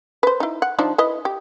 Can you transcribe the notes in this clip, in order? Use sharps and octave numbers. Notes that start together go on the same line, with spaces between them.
B4 C5
D#4 E4
F#5
F3 D4 D#4
E4 B4 D#5
G4